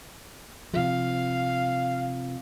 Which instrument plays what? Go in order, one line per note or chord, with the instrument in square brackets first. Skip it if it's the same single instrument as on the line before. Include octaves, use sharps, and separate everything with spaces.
[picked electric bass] C3 F3 [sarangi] F5